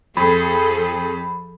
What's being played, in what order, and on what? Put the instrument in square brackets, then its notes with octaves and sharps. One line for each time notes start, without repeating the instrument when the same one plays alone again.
[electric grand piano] F2 [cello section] F3 G#4 A4 [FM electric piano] B5